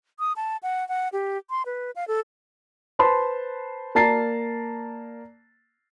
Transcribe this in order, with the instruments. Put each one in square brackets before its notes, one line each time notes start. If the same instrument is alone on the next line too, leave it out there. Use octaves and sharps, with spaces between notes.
[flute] D#6
A5
F#5
F#5
G4
C6
B4
F5
A4
[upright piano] B4 C5 A5 B5 C6
A#3 D5 A5 A#5 A6 C7